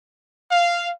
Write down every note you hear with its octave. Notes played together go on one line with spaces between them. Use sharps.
F5